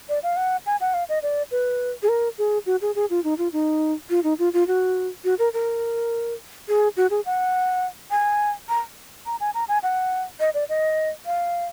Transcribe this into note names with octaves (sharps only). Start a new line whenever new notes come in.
D5
F5
F#5
G#5
F#5
F5
D#5
D5
B4
G#4
A#4
G#4
F#4
G#4
G#4
F4
D#4
F4
D#4
F4
D#4
F4
F4
F#4
F#4
A#4
A#4
G#4
F#4
G#4
F#5
G#5
A#5
A#5
G#5
A#5
G#5
F#5
D#5
D5
D#5
F5